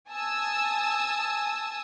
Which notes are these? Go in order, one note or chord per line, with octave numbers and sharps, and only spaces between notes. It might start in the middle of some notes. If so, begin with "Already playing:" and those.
G#5 A5 D#6 E6